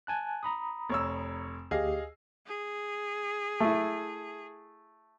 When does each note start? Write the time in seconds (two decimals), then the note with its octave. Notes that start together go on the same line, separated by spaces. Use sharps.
0.07 G#5 A5 F#6
0.43 A#5 B5 D#6
0.90 F1 C#5 E6
1.71 D2 G4 G#4 D#5 F5
2.46 G#4
3.60 A3 E4